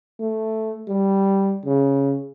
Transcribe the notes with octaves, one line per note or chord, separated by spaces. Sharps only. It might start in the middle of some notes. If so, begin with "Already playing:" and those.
A3
G3
C#3